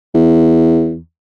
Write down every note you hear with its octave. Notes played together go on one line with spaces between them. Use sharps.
E2